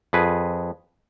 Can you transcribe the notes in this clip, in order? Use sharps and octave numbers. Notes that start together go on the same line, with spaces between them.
F2 G#4 B4